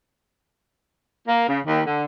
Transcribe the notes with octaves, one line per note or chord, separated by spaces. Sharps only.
A#3
C#3
D#2
D3